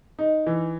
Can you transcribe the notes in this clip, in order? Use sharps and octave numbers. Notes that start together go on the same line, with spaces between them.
D#4
E3